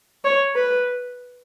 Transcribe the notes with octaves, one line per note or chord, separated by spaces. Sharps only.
C#5
B4